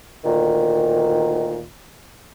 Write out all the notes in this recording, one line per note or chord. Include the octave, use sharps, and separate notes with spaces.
D2 A#2 D#3